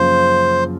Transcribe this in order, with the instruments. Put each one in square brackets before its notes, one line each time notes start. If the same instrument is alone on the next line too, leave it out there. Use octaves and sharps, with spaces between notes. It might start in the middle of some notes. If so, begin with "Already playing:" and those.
Already playing: [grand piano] F#2 C#3 F3 A#3 F4 [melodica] C5